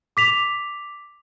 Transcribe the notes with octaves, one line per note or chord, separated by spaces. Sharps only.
D6 B6 F7